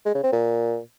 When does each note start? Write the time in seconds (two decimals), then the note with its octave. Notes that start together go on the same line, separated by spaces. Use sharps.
0.06 G#3
0.15 C#3
0.23 C4
0.32 A#2